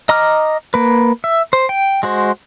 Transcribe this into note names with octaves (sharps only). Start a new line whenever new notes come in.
D#5 A#5 D6 D#6 F6
A#3 B4
E5
C5
G5
G#3 F#4 C5